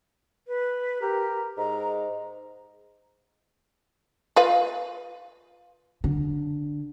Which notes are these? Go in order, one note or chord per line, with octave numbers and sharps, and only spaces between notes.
B4
G4 A#4
G#2 A#5
F4 B4 F5
D3